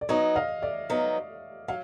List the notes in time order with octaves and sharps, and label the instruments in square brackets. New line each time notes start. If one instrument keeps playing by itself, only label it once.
[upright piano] D5
[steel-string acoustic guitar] F#3 B3 D#4 [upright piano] C#5 D#5
[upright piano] D#5 F5
D5 E5
[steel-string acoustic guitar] F#3 B3 D#4
[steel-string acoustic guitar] F#3 [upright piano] F5